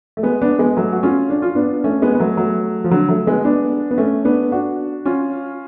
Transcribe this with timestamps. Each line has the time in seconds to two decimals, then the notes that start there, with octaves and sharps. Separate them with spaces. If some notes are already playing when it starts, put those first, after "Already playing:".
0.17 A3
0.23 G#3 B3
0.41 B3 D4
0.59 G#3 B3
0.77 F#3 A3
0.92 F#4
1.03 C#4 F4
1.30 D4
1.42 F4
1.55 B3 D4
1.84 A3 C#4
2.02 G#3 B3
2.15 B3
2.20 F#3 A3
2.37 F#3 A3
2.84 F3
2.91 D3 F#3
3.09 F#3 A3
3.27 G#3 B3
3.45 B3 D4
3.91 B3
3.98 A3 C#4
4.25 B3 D4
4.52 D4 F#4
5.06 C#4 F4